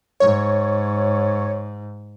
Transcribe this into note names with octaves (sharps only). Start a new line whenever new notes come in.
G#2 C#5